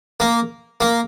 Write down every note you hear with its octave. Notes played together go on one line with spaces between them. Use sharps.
A#3
A#3